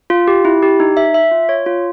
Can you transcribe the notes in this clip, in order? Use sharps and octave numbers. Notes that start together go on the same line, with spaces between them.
F4
G4
E4
G4
D#4
E5
E5
F4
C#5
F4